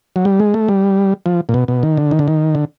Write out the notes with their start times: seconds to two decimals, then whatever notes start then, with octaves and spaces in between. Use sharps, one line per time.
0.16 F#3
0.25 G3
0.40 G#3
0.54 A3
0.68 G3
1.26 F3
1.49 A#2
1.54 B2
1.68 B2
1.83 D#3
1.97 D3
2.11 D#3
2.19 D3
2.28 D#3
2.55 D3